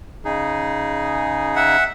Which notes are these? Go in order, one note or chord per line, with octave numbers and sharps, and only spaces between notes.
C#3 D#4 G#4
E5 F#5